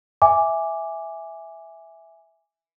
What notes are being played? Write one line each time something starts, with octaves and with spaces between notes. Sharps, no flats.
E5 G#5 D6